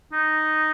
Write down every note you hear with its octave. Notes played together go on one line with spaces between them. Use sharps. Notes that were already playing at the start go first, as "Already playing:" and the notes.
D#4